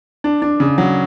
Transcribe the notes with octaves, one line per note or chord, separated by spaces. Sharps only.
D4
D4
C#3
F#3